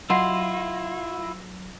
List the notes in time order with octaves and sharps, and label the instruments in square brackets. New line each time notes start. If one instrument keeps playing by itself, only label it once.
[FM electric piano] F#3 A#6 [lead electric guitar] E4 F4 [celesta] D#5 F#5 [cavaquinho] C6